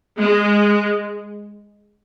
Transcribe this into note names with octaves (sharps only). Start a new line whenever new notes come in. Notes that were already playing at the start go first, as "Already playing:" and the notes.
G#3